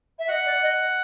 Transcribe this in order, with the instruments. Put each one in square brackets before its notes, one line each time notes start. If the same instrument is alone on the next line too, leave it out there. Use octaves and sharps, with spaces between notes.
[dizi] E5
[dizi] D#5 [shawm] F#5
[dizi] D5
D#5